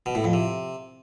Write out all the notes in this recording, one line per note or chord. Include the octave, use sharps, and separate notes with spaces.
B2
A2
F2
C3